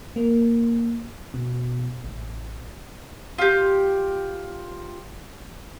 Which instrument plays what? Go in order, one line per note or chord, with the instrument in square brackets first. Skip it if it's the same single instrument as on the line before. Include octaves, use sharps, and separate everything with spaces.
[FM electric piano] A#3
B2
A1
[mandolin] F4 G4